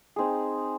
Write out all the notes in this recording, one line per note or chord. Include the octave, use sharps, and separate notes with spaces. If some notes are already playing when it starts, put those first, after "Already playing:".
C4 D#4 G#4